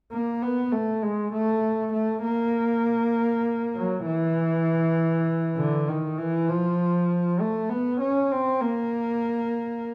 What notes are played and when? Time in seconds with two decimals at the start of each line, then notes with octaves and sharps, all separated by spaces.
0.12 A#3
0.42 B3
0.72 A3
1.02 G#3
1.33 A3
1.93 A3
2.23 A#3
3.76 F#3
4.06 E3
5.58 D3
5.89 D#3
6.18 E3
6.49 F3
7.40 A3
7.70 B3
8.00 C#4
8.32 C4
8.61 A#3